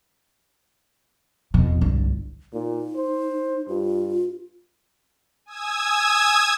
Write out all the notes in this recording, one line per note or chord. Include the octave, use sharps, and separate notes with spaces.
E2 B2 F3
G1 C2 D3 G3
A#2 D#4
C5
G2 F4
G#5 D#6 E6 G#6